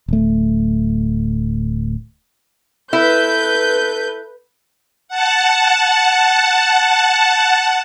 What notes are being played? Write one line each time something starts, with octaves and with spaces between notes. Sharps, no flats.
D1 A3
E4 A4 B4 G6
F#5 A5